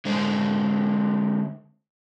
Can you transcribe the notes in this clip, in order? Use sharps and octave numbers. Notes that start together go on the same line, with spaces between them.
D3 G#3 C5